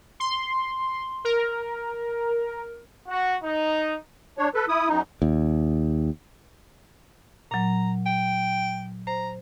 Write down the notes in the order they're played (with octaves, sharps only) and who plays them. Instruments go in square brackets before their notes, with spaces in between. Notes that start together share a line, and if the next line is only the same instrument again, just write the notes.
[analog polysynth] C6
A#4
[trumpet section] F#4
D#4
[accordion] D4 C#5
A4 B4
E4 D#6
F#2 D#4
[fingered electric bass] D#2
[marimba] A#2 F#3 [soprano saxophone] A#5
[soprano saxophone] G5
[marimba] C5 [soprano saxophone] A#5